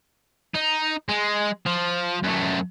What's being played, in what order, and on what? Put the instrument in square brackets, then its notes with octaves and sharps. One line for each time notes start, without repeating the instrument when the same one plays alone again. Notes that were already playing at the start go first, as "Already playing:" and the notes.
[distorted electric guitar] D#4
G#3
F3
F#2 A3